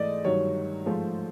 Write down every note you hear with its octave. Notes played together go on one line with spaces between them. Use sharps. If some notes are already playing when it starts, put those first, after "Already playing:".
Already playing: G#2 E3 A3 D5 D#5
G2 D#3 F#3 C#5
G#2 F3 A3